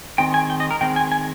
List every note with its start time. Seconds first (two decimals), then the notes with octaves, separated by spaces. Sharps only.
0.18 D#3 G#3 C4 G5
0.34 G#5
0.50 G5
0.60 D#5
0.71 A#4
0.81 D#3 G#3 C4 G5
0.96 G#5
1.12 G#5